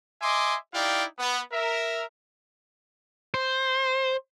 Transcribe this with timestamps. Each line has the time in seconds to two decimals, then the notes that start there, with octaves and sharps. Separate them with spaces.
0.22 D#5 E5 G#5 C6 D6
0.73 D#4 E4 G4 D5 F5 G5
1.18 B3
1.52 A#4 E5
3.34 C5